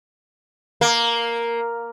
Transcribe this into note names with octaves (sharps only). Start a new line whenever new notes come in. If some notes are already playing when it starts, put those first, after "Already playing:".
A#3